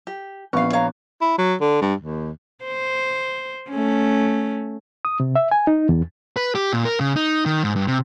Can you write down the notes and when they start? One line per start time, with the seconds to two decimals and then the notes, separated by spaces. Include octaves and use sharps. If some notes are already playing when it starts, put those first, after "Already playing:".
0.07 G4
0.53 A#1 B3 C#4 F5
0.73 C#5 F5 A#5
1.21 E4
1.38 F#3
1.60 D3
1.81 G2
2.00 D#2
2.64 C5
3.70 A3 C#4
5.05 D#6
5.20 C3
5.36 E5
5.51 G#5
5.67 D#4
5.89 E2
6.37 B4
6.55 G4
6.73 A#2
6.85 A#4
7.00 C#3
7.16 D#4
7.46 D#3
7.64 G#2
7.76 G2
7.88 C3